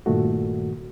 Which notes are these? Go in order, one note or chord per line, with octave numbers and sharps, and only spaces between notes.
G2 A#2 D#3 A3 F#4